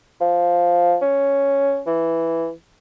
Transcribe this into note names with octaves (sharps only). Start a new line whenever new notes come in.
F3
C#4
E3